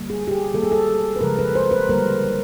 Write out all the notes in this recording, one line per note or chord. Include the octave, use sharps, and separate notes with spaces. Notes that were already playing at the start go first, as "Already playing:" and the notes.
Already playing: D3 G3 A#3
G#4
G4
G#4
D#3 G3 A#3 A4
G#4
A4
B4
C#3 F3 G#3 A#4
B4
C5
B4
D3 G3 A#3 A#4